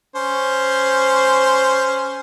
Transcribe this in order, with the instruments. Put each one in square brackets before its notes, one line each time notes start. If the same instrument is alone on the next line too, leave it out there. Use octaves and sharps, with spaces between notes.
[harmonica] C#4 C5